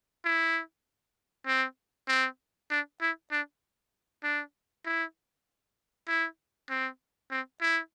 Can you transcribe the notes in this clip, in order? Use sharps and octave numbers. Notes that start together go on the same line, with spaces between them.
E4
C4
C4
D4
E4
D4
D4
E4
E4
C4
C4
E4